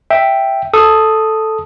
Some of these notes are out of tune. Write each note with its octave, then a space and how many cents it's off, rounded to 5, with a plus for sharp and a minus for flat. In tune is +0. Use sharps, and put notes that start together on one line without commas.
E5 +0 G5 +0
A4 +0 D#6 +0